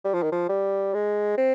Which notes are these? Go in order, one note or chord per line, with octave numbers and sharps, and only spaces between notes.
G3
F3
D#3
F3
G3
G#3
C4